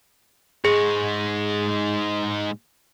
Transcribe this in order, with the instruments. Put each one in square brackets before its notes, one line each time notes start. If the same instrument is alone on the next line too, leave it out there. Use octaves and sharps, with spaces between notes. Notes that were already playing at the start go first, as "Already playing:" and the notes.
[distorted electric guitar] G#2 G#3 [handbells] G#4